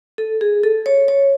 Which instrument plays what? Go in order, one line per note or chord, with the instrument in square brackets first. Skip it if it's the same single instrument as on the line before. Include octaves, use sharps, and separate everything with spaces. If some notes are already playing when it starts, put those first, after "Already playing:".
[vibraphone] A4
G#4
A4
C#5
C#5